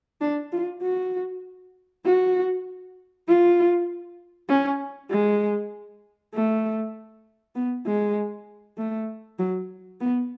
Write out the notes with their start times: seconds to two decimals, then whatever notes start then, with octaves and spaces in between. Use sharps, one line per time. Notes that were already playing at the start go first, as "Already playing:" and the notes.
0.21 D4
0.52 F4
0.82 F#4
2.05 F#4
3.28 F4
4.49 C#4
5.10 G#3
6.34 A3
7.55 B3
7.86 G#3
8.77 A3
9.39 F#3
10.00 B3